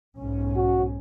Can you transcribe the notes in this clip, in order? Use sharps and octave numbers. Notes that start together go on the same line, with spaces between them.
B1 G#2 C#4
F#4